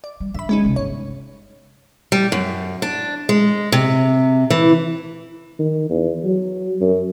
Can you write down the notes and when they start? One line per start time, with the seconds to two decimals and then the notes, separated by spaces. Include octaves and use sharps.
0.04 D5
0.20 G3
0.34 D3 E5 B5
0.49 G#3 C#4 D#4
0.64 C#2 C3
0.76 G1 C#5
2.12 G3
2.32 F#2
2.82 D4
3.29 G#3
3.72 C3
4.50 E3
5.59 D#3
5.90 E2
6.24 F#3
6.81 F#2